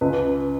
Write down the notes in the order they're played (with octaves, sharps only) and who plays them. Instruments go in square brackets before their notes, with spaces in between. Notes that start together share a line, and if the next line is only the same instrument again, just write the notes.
[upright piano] C#2 B4